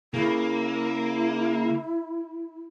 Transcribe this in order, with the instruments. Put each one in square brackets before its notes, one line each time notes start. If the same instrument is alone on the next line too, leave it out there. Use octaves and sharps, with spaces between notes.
[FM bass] C#3 [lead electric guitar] A#3 [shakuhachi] E4